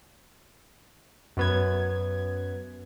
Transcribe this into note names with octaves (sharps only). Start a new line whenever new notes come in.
F#2 B3 G#6